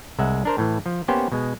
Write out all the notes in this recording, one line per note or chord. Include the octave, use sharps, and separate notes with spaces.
C2 G#3 E5 F#5
D4 A#4 C5
A2 E3
F3
A#3 B3 C#4 G4 C5
B2 G#3